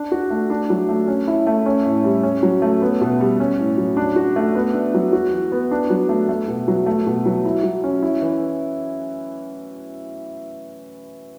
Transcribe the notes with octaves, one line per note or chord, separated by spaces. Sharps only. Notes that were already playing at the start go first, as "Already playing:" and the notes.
Already playing: D4
F#4
A3
D4
F#3
A3
C#4
E4
A3
C#4
A2
G3
C#4
F#3
A3
B3
B2
G3
C#4
A2
F#3
D4
F#4
A3
B3
D4
F#3
F#4
E3
B3
D4
F#3
A3
A3
B2
F#3
A3
B2
F#3
E4
F#3
C#4
E4
E3